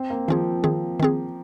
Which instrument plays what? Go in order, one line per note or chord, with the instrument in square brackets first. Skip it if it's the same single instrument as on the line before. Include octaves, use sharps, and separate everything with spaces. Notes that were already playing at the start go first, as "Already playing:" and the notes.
Already playing: [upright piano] C4
A#3
[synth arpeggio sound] D#3 C4 G#4 [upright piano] F3
[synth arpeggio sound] D#3 C4 G#4
D#3 C4 G#4